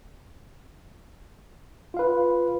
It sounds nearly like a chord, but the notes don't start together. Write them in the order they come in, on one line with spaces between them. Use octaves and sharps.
F4 F5 B4